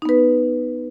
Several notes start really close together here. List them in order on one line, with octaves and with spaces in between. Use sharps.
D#4 B3 B4